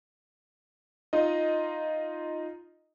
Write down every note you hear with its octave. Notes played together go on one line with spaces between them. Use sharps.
D#4 F4 D#5